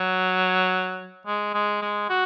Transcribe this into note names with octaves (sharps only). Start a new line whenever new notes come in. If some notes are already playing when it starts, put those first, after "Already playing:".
Already playing: F#3
G#3
G#3
G#3
F#4